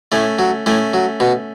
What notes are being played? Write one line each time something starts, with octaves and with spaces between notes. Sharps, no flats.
A2 A3 C#4
F#3
A2 A3 C#4
F#3
B2